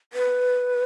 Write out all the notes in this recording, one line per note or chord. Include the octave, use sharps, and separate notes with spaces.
B4